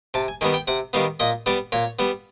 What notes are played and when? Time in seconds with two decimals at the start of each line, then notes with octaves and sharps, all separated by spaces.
0.14 C3 A5
0.28 G#5
0.41 D#3 G3 B3 G#5
0.54 G5
0.67 C3 F#5
0.93 D#3 G3 B3 F5
1.20 A#2 D#5
1.46 G3 B3 D5
1.72 A#2 C#5
1.99 G3 B3